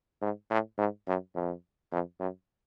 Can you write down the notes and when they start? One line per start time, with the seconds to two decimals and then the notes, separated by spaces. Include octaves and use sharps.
0.22 G#2
0.50 A2
0.78 G#2
1.08 F#2
1.35 F2
1.92 F2
2.20 F#2